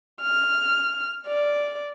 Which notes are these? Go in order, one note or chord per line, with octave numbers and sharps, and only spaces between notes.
F6
D5